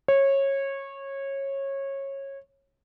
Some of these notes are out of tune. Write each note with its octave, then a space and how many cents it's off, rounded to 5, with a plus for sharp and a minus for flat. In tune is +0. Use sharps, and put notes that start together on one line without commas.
C#5 -20